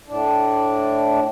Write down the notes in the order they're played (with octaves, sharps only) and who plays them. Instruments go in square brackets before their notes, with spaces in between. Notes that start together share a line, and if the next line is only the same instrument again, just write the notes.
[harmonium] A2 D4